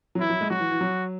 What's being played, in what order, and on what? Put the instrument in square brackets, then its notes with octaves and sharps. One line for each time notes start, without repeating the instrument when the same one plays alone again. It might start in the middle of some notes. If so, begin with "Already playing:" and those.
[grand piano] F#3
[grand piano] E3 [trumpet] E4
[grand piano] F#3
G#3
[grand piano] F#3 [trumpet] F#4
[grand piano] E3
E3
F#3